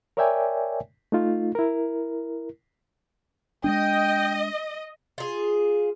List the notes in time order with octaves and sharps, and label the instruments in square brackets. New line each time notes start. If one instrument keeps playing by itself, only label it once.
[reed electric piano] A#4 C#5 D5 E5 G5 G#5
A3 D#4 F4
E4 A#4
[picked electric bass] G#3 A3 D4 [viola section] D#5 [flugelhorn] G5
[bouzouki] F4 G#4